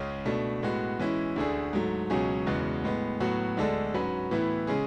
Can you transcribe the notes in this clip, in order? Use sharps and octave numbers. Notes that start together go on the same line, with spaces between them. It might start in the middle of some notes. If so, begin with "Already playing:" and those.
Already playing: C#2 C#3 G#3 C#4
B2 A3 D4
A2 G#3 B3 F#4
E3 G#3 C#4 E4
D2 D3 A3 D4 G#4
G#2 F#3 A3
C#2 B2 F#3 C#4 G#4
E2 C#3 G#3 B3 F#4
A2 G#3 B3
A2 F#3 B3 F#4
D2 D3 G#3 D4 A4
G#2 F#3 C#4 F#4 B4
A2 E3 B3 E4
C#3 G#3 C#4 G#4